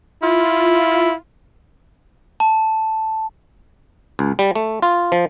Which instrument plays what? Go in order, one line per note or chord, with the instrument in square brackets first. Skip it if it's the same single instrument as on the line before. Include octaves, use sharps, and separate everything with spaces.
[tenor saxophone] E4 [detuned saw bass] F4
[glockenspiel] A5
[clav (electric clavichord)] C#2
G3
A3
F4
F3